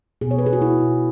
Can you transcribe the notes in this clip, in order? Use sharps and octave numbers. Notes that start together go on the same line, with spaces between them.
B2 G#4
C#5
B2 B4
G#4
F#4
B2 E4
B2